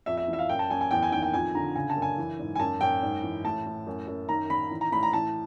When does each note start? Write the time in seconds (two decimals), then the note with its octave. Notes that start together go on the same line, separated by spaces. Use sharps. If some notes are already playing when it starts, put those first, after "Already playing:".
0.06 F2 E5
0.17 E5
0.28 E3
0.33 E5
0.39 F5
0.49 F#2 G5
0.59 A5
0.70 F#2 G#5
0.81 G#5
0.91 E2 G5
1.02 G#5
1.12 D#3 G5
1.23 G5
1.33 F2 G#5
1.55 D3 A#5
1.76 C#3 G#5
1.90 A5
1.96 F#2
2.02 G#5
2.18 E3
2.39 G#2
2.55 G#5
2.59 F#2 A5
2.81 F#2 G5
3.03 G#2
3.23 E3
3.44 A2 A5
3.66 A2
3.87 F#2
4.07 F#2
4.29 D#3 A#5
4.50 D#3 B5
4.71 E3
4.81 A#5
4.92 A2 B5
5.03 A#5
5.13 E3 A5